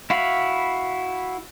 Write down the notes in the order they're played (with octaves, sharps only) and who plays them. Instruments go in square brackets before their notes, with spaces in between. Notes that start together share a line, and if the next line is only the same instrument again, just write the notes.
[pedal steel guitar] E4 F#4 F5 B5